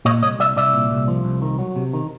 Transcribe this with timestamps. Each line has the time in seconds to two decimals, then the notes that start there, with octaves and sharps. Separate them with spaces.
0.05 A#2 C#5 D#5
0.23 C2 C#5 D#5
0.39 C2 D5 E5
0.56 C2 D5 E5
0.73 A#2
0.91 C2
1.08 F3
1.25 C2
1.42 D#3
1.59 F#3
1.76 C3
1.93 D#3